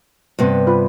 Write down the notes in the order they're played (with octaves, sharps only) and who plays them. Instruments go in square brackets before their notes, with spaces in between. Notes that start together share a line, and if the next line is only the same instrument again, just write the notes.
[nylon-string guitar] G2 C3 B3
[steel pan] F4 B4